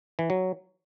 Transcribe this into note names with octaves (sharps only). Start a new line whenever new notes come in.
E3
F#3